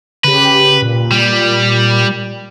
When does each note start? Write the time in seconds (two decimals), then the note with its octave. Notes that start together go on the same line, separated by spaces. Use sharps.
0.24 C#3 G4 B4
0.82 A#2
1.11 G3